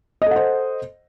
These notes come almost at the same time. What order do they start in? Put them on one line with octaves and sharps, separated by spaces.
D#5 A4 F#5 C5